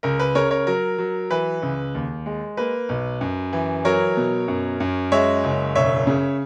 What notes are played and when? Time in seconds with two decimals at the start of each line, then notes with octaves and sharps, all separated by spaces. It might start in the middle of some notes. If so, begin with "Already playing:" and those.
0.03 C#2 A#4
0.19 B4
0.35 C#3 A#4 C#5
0.51 A#4 C#5
0.67 F#3 A#4
0.98 F#3
1.30 E3 B4
1.62 C#2
1.95 D#2
2.26 G#3
2.57 A#3 B4
2.89 B1
3.21 F#2
3.53 E3
3.85 F#3 A#4 C#5
4.17 B2
4.48 F#2
4.80 F#2
5.12 G#3 C#5 E5
5.44 F#1
5.75 E1 C#5 E5
6.07 C#3